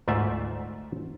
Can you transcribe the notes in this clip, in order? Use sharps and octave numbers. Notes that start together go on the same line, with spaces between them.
D2 G#2 A3 F4 D5 E5